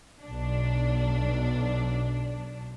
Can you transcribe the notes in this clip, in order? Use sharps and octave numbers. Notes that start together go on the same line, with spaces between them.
B1 D4